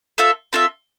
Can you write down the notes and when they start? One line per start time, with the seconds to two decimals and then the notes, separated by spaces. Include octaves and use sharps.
0.18 C4 F4 A4 E5
0.53 C4 F4 A4 E5